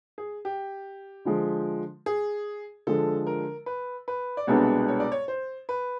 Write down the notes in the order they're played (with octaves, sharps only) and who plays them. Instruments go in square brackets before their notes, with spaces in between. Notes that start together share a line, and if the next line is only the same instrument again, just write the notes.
[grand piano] G#4
G4
[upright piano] D3 F3 G#3
[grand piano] G#4
[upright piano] D3 F3 G#3 [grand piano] A4
[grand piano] A#4
B4
B4
D5
[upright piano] C2 B2 G#3 B3 D4 [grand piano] C#5
[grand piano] C#5
D5
C#5
C5
B4